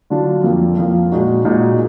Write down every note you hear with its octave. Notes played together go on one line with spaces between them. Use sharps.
D3 F#3 D4 F4
F2 F3 A#3 F4
F2 F3 A#3 F4
A#2 G#3 D#4 F#4
A#2 G#3 D#4 F#4